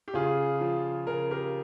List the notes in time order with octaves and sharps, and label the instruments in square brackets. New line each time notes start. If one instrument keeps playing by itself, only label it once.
[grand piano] G4
C#3 F4 G#4
F3
C#3 A#4
G4 A#4